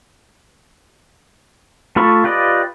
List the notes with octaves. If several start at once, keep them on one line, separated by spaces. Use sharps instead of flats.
A3 F4 A4 B5 C#6
F4 G4 B4 D5 D#5